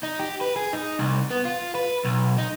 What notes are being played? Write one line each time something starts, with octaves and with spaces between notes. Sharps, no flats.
D#4
G4
B4
G#4
D#4
C2
B3
F4
B4
B1
D#4